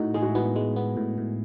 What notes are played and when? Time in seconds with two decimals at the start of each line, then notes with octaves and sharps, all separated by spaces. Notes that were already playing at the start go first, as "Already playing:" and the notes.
Already playing: A2 D#4 F#4
0.14 G#3 G#4
0.22 F#4
0.29 E4
0.35 B3 F#4
0.56 G#3
0.76 B3
0.97 A2
1.18 A2